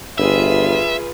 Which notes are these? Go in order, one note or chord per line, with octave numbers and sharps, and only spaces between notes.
G1 F4 G#4 B4 E5